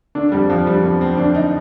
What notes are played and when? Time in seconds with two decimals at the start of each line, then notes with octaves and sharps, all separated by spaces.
0.15 D3 D4
0.32 F2 G3
0.49 F2 F3
0.66 D3 G3
0.83 F2 B3
1.01 F2 C4
1.17 D3 D4
1.35 D#4